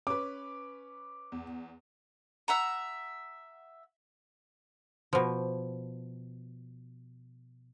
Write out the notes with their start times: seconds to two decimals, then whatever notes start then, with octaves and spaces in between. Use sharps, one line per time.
0.07 C#4 B4 D6
1.32 E2
2.48 E5 F#5 A#5
5.13 B2 F3